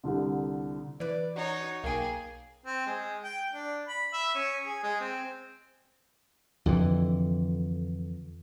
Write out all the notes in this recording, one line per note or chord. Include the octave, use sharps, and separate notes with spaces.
C2 D3
E3 B4 D5
D#4 F#4 C#5
B1 A#3 G#4 G5
C4
G#3
G5
D4
B5
E5
C#4
G#4
G#3
C4
F2 D3 E3